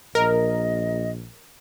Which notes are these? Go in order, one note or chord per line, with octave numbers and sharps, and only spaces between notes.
A#1 A#4 D#5